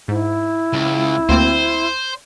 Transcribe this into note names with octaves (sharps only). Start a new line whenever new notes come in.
G#2 E4
C#2
D2 A#3 C4 C5